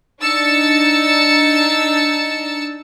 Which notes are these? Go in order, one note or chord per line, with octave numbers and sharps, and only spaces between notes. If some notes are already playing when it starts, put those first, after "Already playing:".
D4 D#4 E6 A6 C#7